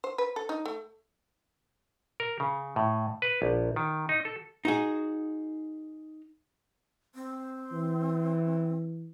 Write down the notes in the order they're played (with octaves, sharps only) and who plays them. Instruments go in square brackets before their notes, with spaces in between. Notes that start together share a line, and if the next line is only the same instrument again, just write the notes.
[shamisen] C5
B4
A4
D#4
A3
[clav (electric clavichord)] A#4
C#3
A2
B4
A#1
D#3
D#4
A4
[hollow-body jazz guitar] D#4 F#4 G#4
[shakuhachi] C4
[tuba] E3